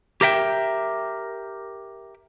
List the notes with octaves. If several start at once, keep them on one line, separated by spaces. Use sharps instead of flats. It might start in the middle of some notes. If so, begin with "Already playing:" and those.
G4 A#4 E5 G5